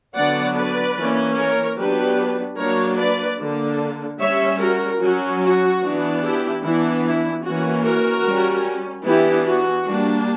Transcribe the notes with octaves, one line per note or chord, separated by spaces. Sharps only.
D3 F#3 B3 D4 D5 F#5
B4 D5
E3 A#3 C#4
A#4 C#5
F#3 B3 D4 G4 B4
F#3 A#3 D4 A#4 C#5
B4 D5
D3 A#3 D4
G3 C#4 C#5 E5
F#4 A#4
F#3 C#4 F#4
F#4
E3 B3 D4
E4 G4
E3 B3 D4 E4
E4
E3 A#3 C#4 F#4
F#4 A#4
G3 C#4
E3 B3 D4 E4 G4
F#4
G3 A#3 D4